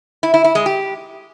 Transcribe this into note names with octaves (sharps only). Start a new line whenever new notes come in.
E4
E4
E4
G#3
G4